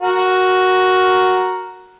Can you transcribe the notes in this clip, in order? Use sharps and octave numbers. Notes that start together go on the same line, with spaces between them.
F#4 A#4